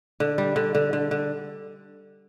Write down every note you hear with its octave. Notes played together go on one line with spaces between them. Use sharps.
D3
G3
D3
D3
D3
D3